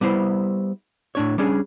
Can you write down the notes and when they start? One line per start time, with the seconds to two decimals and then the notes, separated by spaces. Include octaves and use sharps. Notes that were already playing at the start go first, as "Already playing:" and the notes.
0.01 G3 B3 E4 C5
1.15 A2 D4 C#5
1.38 G3 C#4 D4 G#4